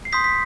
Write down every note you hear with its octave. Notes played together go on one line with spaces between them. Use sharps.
C7
C6 D#6 G6 B6
B6